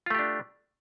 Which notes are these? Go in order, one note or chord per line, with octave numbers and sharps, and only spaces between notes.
A3 D4 F4 G4